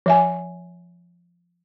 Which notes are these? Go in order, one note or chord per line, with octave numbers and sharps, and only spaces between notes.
F3 E5 G#5